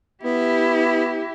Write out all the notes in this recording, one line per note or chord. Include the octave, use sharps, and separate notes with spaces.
B3 E4 G4